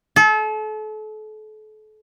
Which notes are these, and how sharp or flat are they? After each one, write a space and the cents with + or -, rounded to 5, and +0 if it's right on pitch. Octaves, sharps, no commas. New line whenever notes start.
A4 -35